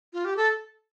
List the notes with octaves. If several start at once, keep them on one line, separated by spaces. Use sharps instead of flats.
F4
G4
A4